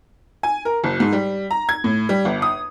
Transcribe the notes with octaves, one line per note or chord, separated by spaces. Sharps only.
G#5
A#4
F#1
G#2
G3
A#5
G#6
A2
G3
G1
D#6